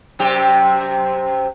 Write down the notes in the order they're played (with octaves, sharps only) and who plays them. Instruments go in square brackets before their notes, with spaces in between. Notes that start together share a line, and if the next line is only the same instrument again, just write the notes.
[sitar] F#2 C3 G4